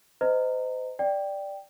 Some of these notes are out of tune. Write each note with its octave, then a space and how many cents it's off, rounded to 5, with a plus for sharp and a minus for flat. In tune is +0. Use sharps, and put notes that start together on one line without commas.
C5 -35 D#5 +0 A#5 -25
D5 +0 G5 +0